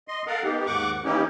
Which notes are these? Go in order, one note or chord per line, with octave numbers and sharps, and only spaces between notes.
D#5 C6
A4 A#4 F5 F#5
B3 D#4 G4
D#2 G#2 F#5 C#6 D6
E3 A#3 C#4 D#4 E4 G4